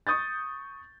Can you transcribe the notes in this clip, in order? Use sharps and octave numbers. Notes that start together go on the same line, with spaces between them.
C#6 D#6 G6 A6